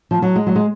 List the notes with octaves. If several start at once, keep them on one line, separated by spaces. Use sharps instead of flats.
F3
F#3
G#3
F#3
G#3